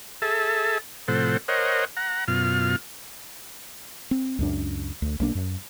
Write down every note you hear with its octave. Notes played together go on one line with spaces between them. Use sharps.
G#4 A4 E5 A5
A2 C3 F3 A4 C5 F#5
A#4 C5 C#5 D#5 F#5
F#5 A#5
F#2 B2 F4 F6
C4
C#2 F#2 D4
D2
B1 A#3 D4
F#2